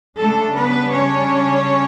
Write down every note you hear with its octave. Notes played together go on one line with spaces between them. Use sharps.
C#3 G3 A3 D4 A4
B3 B4
C#4 C#5